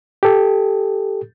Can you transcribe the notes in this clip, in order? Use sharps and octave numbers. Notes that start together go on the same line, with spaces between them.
G4 A4